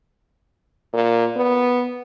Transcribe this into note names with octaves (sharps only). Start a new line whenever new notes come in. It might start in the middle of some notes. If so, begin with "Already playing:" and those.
A#2
B3